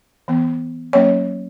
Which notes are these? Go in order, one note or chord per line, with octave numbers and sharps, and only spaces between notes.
E3 B3
F#3 A#3 C#4 C#5